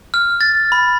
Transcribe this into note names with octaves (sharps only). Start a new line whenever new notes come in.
F6
A6
B5